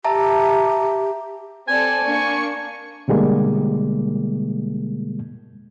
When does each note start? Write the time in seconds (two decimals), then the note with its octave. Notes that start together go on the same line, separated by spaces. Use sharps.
0.05 G4 E5 A5 A#5
1.68 C4 A4 D5 G#5
2.04 A#3 D4 C#6
3.08 B2 D3 G3 G#3 A#3